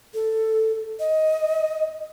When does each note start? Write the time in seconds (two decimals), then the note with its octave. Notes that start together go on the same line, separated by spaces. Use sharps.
0.14 A4
1.00 D#5